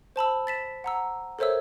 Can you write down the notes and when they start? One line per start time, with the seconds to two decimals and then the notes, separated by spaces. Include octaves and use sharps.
0.16 C5 A5 B5 E6
0.47 A6 B6 E7
0.84 F#5 A#5 E6
1.39 A4 A#4 C5 C#5 E5 E6